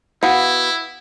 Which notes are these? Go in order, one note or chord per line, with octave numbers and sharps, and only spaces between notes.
B3 E4 F#4 F5 F#5